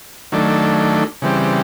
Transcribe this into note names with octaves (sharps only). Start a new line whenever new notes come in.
D#3 F#3 A3 D4
C#3 E3 G3 C4